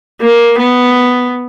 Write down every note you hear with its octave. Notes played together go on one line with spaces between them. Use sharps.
A#3
B3